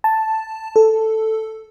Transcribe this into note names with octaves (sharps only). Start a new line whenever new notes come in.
A5
A4